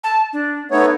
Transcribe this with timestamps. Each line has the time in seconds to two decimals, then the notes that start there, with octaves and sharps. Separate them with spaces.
0.04 A5
0.33 D4
0.71 A3 B3 D#4 C#5